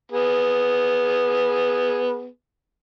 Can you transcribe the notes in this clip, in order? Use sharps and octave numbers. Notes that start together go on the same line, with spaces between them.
B3 G#4